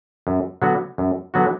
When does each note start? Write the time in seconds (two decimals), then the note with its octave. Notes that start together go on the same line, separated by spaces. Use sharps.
0.27 F#2
0.62 D3 F#3 B3 F#4
0.98 F#2
1.34 D3 F#3 B3 F#4